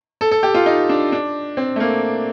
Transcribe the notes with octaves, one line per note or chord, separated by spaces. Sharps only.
A4
A4
G4
F4
D#4
D4
D4
C4
A3
A#3